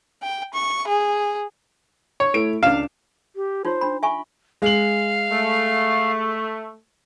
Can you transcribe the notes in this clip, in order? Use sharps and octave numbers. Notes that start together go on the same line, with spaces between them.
G5
C#6
G#4
C#5
A3 E4 D7
C#2 D4 F5 E7
G4
D#4 F4 C5 C#5
D4 B5
E5 G#5 B5 C#6
G#3 F5 F#7
A3